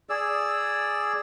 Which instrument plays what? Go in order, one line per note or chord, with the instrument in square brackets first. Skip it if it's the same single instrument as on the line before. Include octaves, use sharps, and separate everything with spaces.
[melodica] G#4 D5 E6